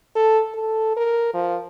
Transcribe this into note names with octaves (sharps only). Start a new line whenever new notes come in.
A4
A4
A#4
F3